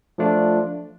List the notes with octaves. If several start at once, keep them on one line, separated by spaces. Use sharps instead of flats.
F3 A3 D4 F4